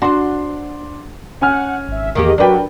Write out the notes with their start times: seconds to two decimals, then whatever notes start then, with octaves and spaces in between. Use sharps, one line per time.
0.02 D4 F#4 C5 C6
1.41 C#4 F#5 G#5 F6
1.88 G#1 E5
2.15 E2 D#3 A#3 G4 G#4 D#5
2.38 F#3 D4 F#4 A#4 B4 D5 G5